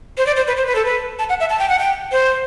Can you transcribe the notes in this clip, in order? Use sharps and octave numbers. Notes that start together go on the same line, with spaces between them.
C5
D5
C5
B4
C5
B4
A4
B4
A5
F#5
E5
A5
G5
F#5
G5
C5